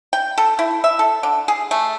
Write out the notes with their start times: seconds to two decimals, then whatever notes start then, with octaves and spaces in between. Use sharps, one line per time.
0.13 G5
0.38 A4
0.59 E4
0.84 E5
0.99 A4
1.23 D3
1.48 G#4
1.71 A3